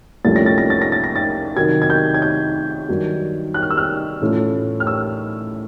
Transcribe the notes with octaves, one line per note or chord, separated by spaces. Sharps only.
C2 A#2 F3 A3 C#4 A6
A#6
A6
A#6
A6
A#6
A6
A#6
A6
C3 D#3 F#3 G#6
G#6
G6
G#6
G6
G2 D#3 F#3
F#6
F6
E6
F6
A2 E3 A3 C#4 F4
F6
E6